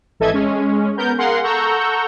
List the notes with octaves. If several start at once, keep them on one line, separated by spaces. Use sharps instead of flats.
G#1 E3 A4 D#5 E5 G#6
G#3 C#4
B3 A#4 G6
G#4 A#4 F5 F#5 C6
A4 F#5 A#5 C#6 E6 G6